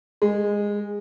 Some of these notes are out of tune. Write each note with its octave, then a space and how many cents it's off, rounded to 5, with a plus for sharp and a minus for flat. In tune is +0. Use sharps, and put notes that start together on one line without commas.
G#3 -15